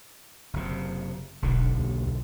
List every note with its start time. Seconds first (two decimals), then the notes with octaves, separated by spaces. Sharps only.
0.53 F#1 C3
1.42 E1 B1 D3
1.78 D#2